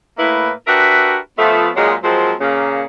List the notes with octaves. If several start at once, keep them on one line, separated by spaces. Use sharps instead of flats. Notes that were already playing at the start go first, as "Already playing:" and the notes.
A2 A#3 E4 B4
D4 F#4 G4 A#4 B4 E5
F3 A3 B3
F#2 A#2 F#3 G#3
F3 F#3 G#3 A#3 C4
A#2 C#3 A#3